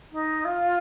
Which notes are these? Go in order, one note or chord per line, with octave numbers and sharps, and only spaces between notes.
D#4
F4